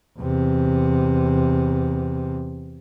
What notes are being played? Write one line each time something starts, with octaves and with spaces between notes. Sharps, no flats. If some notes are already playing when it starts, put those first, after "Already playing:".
E2 C3